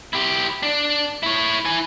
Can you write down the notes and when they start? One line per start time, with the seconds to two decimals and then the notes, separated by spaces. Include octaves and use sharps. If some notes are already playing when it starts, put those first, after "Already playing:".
0.13 E4 G4
0.63 D4
1.23 E4 C#5
1.65 E4 G#5